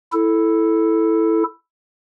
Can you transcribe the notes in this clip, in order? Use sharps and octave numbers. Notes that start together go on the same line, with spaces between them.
E4 A4